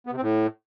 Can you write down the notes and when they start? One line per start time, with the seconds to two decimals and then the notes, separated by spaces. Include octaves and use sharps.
0.07 B3
0.12 C3
0.17 C4
0.22 A2